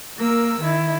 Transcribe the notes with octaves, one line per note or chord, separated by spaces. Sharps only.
A#3 A#4 E6
D#3 E4